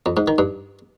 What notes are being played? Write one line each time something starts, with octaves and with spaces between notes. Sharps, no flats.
F2
G#2
D#3
G2